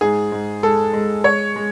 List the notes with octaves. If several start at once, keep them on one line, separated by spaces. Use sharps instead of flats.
G#2 G#4
G#2
G#3 A4
G#3
G#3 C#5
G#3